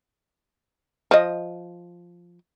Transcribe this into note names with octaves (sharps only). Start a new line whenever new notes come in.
F3 D#5